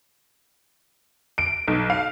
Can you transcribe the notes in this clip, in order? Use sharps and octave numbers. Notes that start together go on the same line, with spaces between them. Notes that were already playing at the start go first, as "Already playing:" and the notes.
D7
B1
F5